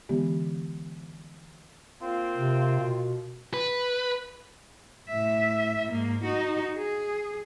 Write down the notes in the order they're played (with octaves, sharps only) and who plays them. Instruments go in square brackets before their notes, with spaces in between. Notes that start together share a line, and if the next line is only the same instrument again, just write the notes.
[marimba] D3 E3 G#3 B3 G4
[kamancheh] A#3 F4 [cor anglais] C4
[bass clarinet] C3
B2
[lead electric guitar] B4
[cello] A2 E5
G#2 A#3
D#4 F#4
G#4